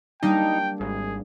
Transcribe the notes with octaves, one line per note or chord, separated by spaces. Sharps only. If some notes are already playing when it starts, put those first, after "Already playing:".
G3 A#3 D4 D#4 G5
G#1 G#4